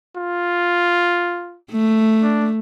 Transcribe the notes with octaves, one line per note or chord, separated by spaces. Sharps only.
F4
A3
D4